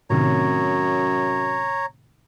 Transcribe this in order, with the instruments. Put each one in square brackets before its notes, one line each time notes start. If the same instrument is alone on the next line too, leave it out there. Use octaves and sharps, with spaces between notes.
[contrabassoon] F#2 [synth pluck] A2 C3 D#3 [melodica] C#5 A#5